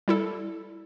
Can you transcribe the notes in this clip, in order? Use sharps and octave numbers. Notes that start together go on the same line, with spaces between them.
G3 E4 A4